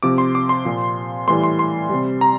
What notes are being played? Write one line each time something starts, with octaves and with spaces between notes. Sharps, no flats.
C3 F3 D6
C6
D6
C6
A#2 F3
A2 E3 G3 C6
C6
C6
C3 G3
A#5